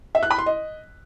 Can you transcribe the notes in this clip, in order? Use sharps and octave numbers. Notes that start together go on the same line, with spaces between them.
E5
F#6
B5
C6
D#5